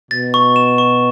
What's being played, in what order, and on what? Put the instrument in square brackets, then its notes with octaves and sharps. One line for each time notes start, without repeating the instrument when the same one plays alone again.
[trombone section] B2 [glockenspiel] A6
[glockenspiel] C#6
E7
C#6